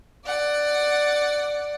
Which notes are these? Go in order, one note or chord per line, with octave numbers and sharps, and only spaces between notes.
D5 F#5